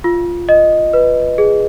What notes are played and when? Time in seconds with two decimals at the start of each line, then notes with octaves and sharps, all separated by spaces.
0.04 F4
0.49 D#5
0.93 B4
1.38 G#4